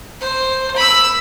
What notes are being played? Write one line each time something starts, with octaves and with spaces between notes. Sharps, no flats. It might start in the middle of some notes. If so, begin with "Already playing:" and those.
C5
B5 E6